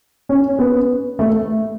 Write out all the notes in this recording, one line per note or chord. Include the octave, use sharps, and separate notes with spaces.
C#4
B3
A3